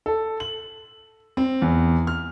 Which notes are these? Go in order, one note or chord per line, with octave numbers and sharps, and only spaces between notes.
A4
F#7
C4
E2
F6